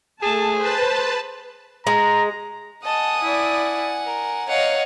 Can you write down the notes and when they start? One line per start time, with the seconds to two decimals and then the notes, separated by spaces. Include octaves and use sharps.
0.22 A3 G#4 A5
0.58 B4 C5 A5
1.87 G#3 A#5
2.85 D#5 F#5 G#5 A5 D#6
3.23 E4 D5
4.05 A#4
4.49 C#5 D#5 F5 F#5